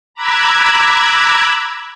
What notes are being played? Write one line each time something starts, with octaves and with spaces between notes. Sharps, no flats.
A#5 B5 D6 E6 F#6 G#6